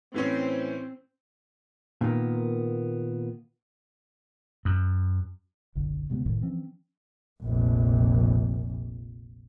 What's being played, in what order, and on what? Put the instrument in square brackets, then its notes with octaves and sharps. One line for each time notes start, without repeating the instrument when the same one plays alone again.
[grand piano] A2 E3 C#4 [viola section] C4
[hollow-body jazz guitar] A#2 D#3 A#3 B3
[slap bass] F#2
[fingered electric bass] F#1 B1 D3
D2 C3 G#3 B3
F#1 C2 A2 D#3
E3 F3 C4 C#4
[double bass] F1 A#1